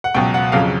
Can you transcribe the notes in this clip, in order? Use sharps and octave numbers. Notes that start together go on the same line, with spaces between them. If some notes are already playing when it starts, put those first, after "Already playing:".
F#5
C#2 B2 F#3 G5
F#5
F2 C#3 F#3 F5